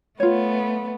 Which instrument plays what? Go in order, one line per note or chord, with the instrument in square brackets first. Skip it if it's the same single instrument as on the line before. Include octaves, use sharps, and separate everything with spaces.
[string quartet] A3 B3 [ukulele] F4 C#5